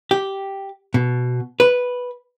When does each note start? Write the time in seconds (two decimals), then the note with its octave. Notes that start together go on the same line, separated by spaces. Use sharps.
0.11 G4
0.94 B2
1.60 B4